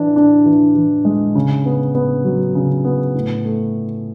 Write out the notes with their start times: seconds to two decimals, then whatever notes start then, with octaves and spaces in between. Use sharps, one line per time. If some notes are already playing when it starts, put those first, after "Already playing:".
Already playing: E3 D4
0.16 D4
0.46 E3
0.76 E3
1.05 G#3
1.35 C#3
1.66 B3
1.95 B3
2.24 F#3
2.55 C#3
2.84 B3
3.15 A2
3.44 A3